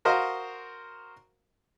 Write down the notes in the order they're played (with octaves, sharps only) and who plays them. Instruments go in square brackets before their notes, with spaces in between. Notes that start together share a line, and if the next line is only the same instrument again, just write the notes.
[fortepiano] F#4 A#4 C5 D#5 F5